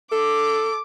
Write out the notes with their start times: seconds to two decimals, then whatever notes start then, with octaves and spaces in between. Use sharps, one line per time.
0.12 A4 D6